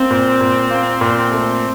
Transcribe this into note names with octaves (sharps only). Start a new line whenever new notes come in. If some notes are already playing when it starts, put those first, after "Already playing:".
Already playing: A#3 C4
A#2
A#2
A#3
A#2
A3